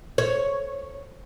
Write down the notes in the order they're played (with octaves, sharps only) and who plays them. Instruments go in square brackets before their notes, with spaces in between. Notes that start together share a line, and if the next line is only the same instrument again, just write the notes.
[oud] C#5